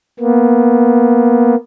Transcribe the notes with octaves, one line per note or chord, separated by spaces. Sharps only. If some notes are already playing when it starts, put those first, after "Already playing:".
A#3 B3